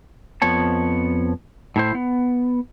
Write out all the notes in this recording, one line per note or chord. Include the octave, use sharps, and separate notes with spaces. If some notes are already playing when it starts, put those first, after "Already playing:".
F2 F3 B3 C#5 A5
A2 E4 C5
B3